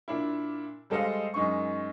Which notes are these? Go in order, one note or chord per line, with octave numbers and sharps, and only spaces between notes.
A#2 D4 E4
G3 G#3 A4 C5 D#5 F5
F#2 G#3 D#4 C#6